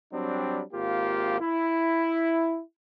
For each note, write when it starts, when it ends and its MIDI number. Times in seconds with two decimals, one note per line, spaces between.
0.13 0.62 54
0.13 0.62 55
0.13 0.62 60
0.13 0.62 62
0.73 1.40 32
0.73 1.40 58
0.73 1.40 65
0.73 1.40 67
1.40 2.60 64